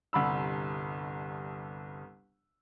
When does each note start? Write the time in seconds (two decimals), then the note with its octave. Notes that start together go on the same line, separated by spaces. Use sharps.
0.13 G1 C2 B5 E6